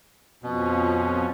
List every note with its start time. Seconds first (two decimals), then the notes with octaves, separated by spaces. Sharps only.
0.43 F2 B2 F3 C#4